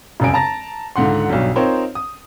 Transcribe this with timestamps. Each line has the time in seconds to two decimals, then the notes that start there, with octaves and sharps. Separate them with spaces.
0.20 E1 C2 F#2 C#3 G#5 D7
0.34 A5 A#5 A6 A#6
0.96 C#2 G#2 D3 F#5 C6
1.29 B1 G2 F#3 G3
1.56 C4 D#4 F4 A#4 C5 C#5
1.95 D#6